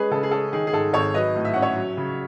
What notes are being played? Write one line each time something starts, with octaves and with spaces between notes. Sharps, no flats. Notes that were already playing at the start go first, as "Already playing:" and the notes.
Already playing: G#3 C#4 G#4 B4
C#3 A4
G#4
C#4 A4
D#3 G#4
G#4
G#2 A4
G#1 A4 C#5
F#3 B4 D#5
A2
E5
C#4 F#5
C#5 E5
F#3
C#3